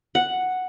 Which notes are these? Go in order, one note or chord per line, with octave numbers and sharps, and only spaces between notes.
F#5